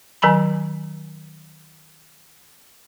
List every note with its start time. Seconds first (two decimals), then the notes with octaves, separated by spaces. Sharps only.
0.22 D#3 F#3 G#5 A#5 B5